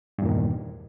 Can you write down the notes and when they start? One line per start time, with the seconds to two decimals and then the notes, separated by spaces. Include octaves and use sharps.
0.18 G2
0.22 E2
0.25 A#2
0.29 D#3